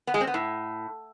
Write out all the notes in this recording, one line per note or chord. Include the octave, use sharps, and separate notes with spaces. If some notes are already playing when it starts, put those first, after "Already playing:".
B3
G#3
C4
B3
A2